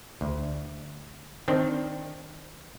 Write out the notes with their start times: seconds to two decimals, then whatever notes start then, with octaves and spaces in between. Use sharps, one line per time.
0.21 D2
1.48 D#3 C4 D4